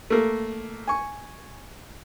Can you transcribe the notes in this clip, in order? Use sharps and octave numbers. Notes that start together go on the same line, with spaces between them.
A3 A#3
G#5 C#6